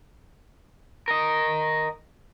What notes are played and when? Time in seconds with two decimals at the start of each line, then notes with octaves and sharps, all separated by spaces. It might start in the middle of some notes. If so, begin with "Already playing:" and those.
1.08 A#4 D#5